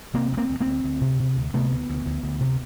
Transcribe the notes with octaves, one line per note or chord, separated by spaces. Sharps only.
C3 A#3 C4
D2
A#3 C4
D2
A#3 C4
D2
D2
C3
C3
D2
C3 A3 B3
D2
D2
D2
D2
C3